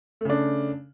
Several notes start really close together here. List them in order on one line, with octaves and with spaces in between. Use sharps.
A3 C#3 D4